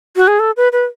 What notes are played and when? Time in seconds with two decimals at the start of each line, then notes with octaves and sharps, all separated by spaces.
0.16 F#4
0.28 G#4
0.39 A4
0.57 B4
0.72 B4